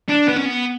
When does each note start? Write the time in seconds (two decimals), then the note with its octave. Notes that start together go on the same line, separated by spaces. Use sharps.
0.08 D4
0.28 B3
0.36 C#4
0.45 B3